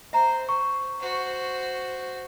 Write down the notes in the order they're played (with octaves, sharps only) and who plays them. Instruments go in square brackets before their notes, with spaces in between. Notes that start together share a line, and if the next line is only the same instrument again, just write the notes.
[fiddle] C5 [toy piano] E5 A#5
[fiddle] C5 [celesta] C#6
[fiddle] F#4 C5